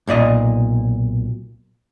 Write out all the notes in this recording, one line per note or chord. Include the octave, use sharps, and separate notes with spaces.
B1 A#2 D5 D#5